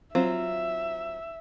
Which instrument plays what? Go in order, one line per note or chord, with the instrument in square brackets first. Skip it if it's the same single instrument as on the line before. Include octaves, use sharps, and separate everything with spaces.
[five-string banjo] F#3 C4 F4 [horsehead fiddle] E5